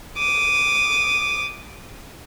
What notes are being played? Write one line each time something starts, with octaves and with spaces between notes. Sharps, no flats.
D6 D#6